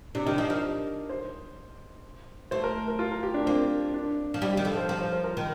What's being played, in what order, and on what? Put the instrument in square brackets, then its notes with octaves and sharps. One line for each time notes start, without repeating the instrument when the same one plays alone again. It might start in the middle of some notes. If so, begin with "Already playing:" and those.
[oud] C3 [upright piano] D4
[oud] D#3 [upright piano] D#4
[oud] F3 [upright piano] D#4
[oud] F3 [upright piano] A#4
[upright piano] C5
[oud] A3 [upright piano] C5
[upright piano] A#4
A#4
F4
A#4
G4
D4
[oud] A#3 [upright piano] C4
[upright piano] D4
[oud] F3
[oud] G3 [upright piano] D#4
[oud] D#3 [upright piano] G4
[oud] F3 [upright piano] A4
[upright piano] C5
[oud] F3 [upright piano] A#4
[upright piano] C5
C5
A#4
[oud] D#3 [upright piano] A#4